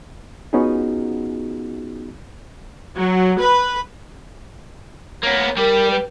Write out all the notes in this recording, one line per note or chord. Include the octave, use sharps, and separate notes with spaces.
B3 C#4 D#4 F4 F#4 G#4
F#3
B4
A#3 B3 C#5
G3 G4 A#4
B4